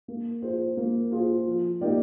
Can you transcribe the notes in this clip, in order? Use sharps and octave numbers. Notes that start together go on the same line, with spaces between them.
A#3
F4 G#4 C5
A#3
F4 G#4 C5
F3
A#3 D#4 G4 D5